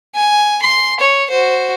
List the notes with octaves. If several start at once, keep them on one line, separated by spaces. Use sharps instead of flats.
G#5
C6
C#5
F#4 C5